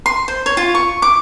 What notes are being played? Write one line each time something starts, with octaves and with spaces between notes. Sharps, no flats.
C6
C5
C#5
F4
C#6
D6